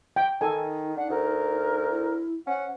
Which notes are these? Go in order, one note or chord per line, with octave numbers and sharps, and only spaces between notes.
G5
D#3 D#4 A4 G#5
D4 F#5
D2 A#4
E4
C#4 C5 F#5